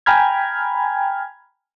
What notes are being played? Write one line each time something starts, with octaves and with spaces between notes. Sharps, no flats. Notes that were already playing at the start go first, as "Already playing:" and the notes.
G5 G#5 A#5 B5 F6 G#6